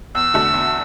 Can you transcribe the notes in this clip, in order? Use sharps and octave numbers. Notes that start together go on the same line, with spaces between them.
E2 E6
D3 A3 F#4
E2